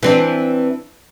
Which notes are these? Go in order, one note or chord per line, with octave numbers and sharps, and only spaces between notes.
E3 C4 D4